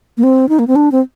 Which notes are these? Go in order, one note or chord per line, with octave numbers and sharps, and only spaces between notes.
A#3
C4
D#4
A#3
C4
D4
C4